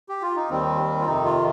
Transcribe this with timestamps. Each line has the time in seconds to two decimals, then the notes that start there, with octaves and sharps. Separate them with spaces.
0.09 G4
0.22 F4
0.36 D#4
0.50 D#2 D#3 G3 C4
1.00 F4
1.06 F2 C3 D#3 D#4
1.25 F4